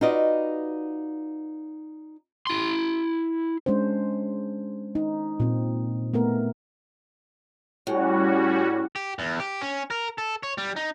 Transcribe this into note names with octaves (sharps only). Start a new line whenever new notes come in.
D#4 F4 F#4 B4 D5 D#5
E4 C6
G#3 C#4 D4 C5
D#4
A#2 C4
A3 B3 A#4
A2 G3 C#4 F#4
G4
E2
G4
C#4
A#4
A4
C#5
G3
D#4